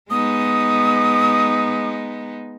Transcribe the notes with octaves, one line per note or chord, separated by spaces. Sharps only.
G#3 B3 D#4 D#6